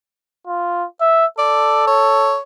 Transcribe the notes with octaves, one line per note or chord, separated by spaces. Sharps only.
F4
E5
A4 D5
C#5